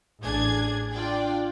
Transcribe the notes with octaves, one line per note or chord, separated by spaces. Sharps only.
A1 D4 G#4 G#6
D4 F4 D5 G5